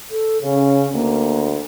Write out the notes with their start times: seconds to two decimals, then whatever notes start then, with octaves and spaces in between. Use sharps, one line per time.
0.11 A4
0.42 C#3 C#4
0.94 D2 A#3